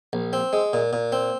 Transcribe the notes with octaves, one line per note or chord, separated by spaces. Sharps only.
A#1
C4
G#3
A#2
A#2
C4